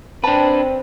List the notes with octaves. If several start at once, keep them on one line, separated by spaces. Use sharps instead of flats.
C4 D4 B4 A5